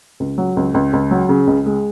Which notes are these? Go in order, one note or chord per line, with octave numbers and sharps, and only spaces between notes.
C#2
F#3
C#2
C#2
C#2
F#3
C#3
C#2
G#3